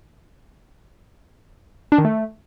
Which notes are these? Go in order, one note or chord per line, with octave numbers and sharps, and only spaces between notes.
D4
D#3
A3